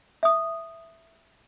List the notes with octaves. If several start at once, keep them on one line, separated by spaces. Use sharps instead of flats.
E5 D#6